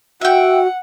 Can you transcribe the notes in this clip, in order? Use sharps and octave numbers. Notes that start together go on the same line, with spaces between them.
F#4 E5 F#5 G5